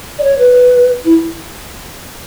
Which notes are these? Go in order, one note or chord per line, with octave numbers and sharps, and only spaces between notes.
D5
C#5
B4
E4